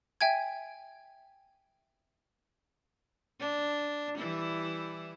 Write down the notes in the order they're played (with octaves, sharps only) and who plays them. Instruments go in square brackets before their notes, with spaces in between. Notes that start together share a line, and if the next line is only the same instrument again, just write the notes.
[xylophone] E5 G5 G#5 G#6
[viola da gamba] D4
E3 G3 E4